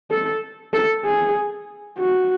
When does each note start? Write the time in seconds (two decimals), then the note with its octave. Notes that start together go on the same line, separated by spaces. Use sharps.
0.11 A4
0.73 A4
1.05 G#4
1.99 F#4